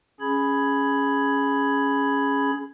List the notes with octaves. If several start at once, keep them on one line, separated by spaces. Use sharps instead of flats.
C#4 G#4 B5 G#6